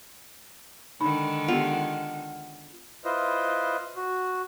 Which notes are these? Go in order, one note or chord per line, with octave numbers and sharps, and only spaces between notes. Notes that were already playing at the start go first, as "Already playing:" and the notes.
D3 D#3 G#3 D#4 B5
B3 F4 G4 F#5 F6
E4 F4 B4 C5 D#5
F#4